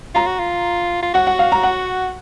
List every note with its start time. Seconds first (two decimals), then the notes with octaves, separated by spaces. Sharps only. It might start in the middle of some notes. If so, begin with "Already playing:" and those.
0.15 F4 A#5
0.27 F#4
0.40 F4
1.02 F4
1.14 F#4 F#5
1.27 F#5
1.39 F5
1.52 A#5
1.63 F#5